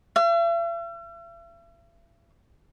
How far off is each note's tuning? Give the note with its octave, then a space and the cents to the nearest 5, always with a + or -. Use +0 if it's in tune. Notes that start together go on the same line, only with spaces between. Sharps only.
E5 +45